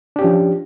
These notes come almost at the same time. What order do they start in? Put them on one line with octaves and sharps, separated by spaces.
D4 G4 C#4 F3